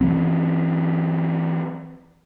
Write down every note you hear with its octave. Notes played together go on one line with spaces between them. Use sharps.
E3 F#3 C4